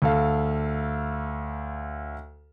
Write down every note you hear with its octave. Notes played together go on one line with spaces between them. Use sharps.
D2 A4 F5